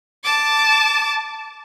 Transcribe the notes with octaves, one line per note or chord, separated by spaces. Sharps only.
A5 D6